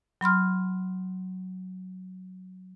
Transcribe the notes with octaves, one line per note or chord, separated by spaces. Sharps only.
F#3 B5 C6 F6